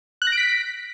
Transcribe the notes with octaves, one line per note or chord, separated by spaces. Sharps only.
F#6
A#6
D7
B6